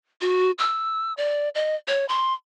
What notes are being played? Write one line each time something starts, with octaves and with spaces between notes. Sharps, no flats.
F#4
E6
D5
D#5
C#5
C6